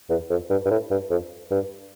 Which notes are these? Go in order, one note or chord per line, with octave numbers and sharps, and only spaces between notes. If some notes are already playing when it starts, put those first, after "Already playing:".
E2
F2
G2
G2
A2
G2
F2
G2